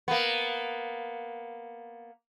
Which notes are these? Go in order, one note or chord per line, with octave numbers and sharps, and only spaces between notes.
A#3 B3